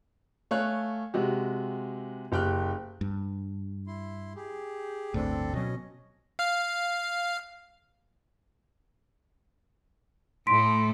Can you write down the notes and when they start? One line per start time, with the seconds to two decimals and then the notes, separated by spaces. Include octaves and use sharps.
0.51 A3 C#5 F5 G#5 F#6
1.14 C3 G#3 F#4 G4
2.32 F#1 G4 G5 F6 F#6
3.01 G2
3.87 E4 C6
4.36 G4 G#4
5.14 G1 D2 A2 C4 D4 A4
5.54 B2 F#3 C#4 D#5
6.39 F5 F6
10.47 A2 A3 C6 B6 D7